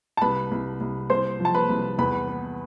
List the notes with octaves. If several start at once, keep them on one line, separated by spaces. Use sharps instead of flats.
A5
C2 B4 B5
C2
C2
C2 C5 C6
F3
A5
B4 B5
C2
E2 B4 B5
B3